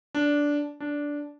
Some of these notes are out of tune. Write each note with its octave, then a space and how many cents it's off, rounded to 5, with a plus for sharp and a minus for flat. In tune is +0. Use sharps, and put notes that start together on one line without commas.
D4 -10
D4 -10